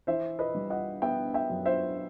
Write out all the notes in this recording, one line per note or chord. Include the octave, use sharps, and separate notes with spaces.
E3 C5 E5
B4 D#5
G3
D#5 F#5
B3 E5 G5
E5 G5
F#2
C5 E5